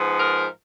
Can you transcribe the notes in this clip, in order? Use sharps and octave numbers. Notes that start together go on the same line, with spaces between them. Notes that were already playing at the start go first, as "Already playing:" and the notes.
Already playing: G#2 F3 B3
A#4